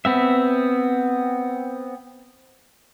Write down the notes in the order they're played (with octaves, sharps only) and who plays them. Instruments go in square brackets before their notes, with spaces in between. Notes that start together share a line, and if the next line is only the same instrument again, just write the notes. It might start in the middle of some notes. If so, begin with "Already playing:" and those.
[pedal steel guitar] B3 C4 E5